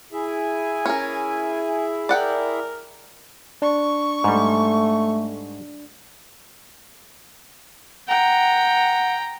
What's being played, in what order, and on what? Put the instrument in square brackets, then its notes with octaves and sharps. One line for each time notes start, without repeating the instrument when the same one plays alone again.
[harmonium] E4 G#4 E5 [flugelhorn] G#5
[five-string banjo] C#4 A#4
[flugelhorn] A#4 [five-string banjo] D5 F#5 G5
[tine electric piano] D4 [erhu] C#6
[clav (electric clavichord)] G#2 G3 [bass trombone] A3
[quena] F#5 [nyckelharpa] G5 A#5